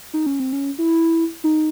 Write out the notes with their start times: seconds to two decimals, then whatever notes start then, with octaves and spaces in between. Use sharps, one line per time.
0.14 D#4
0.26 C#4
0.40 C4
0.53 C#4
0.78 E4
1.44 D#4